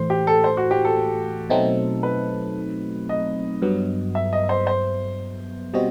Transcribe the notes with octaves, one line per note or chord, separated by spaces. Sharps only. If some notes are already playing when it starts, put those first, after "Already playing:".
Already playing: A2 E3 A3 C5
G4
A4
C5
F#4
G4
A4
B2 F#3 A3 C4 D#4
B4
D#5
G2 F#3 B3
E5
D#5
C5
C5
B2 G3 C4 F#4 D#5